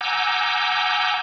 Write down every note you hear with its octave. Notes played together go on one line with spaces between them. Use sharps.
F#5 G#5 A#5 D6 E6 G6